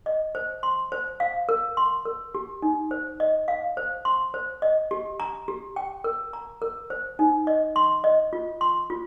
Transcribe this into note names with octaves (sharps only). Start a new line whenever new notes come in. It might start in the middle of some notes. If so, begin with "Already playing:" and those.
D#5
C5
C6
C5
F5
A#4
C6
A#4
G4
D#4
C5
D#5
F5
C5
C6
C5
D#5
G4
A#5
G4
G5
A#4
A#5
A#4
C5
D#4
D#5
C6
D#5
F4
C6
F4